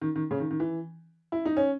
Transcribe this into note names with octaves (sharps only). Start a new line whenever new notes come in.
D#3
D#3
C#3
D#3
D#3
E3
E4
D#4
C#4